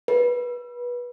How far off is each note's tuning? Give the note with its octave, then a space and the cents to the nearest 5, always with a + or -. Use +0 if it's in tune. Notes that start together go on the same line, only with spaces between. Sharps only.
B4 -25